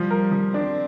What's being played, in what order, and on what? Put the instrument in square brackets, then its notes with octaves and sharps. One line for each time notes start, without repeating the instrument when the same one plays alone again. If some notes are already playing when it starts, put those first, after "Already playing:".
Already playing: [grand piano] F3 [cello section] G3
[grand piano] A#4
F3
[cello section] C4 [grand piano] D4